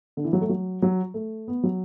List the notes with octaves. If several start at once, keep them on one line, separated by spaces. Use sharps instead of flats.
D3
E3
F#3
A3
F#3
F#3
A3
B3
F#3